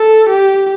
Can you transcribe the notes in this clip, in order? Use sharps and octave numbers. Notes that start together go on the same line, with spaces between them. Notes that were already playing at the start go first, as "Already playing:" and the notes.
Already playing: A4
G4